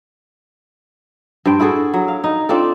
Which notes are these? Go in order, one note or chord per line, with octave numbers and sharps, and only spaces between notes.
G2 C5 G5
E4 F#4 G#4 A4
F#3
F5
D#4
C4 D4 F4 A4